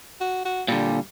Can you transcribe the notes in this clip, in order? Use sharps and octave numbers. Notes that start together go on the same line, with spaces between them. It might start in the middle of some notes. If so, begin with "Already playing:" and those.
F#4
F#4
A#2 D3 G3